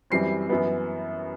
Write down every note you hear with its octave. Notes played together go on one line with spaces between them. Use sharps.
F#2 E3 G3 C4 C7
F#2 E3 B3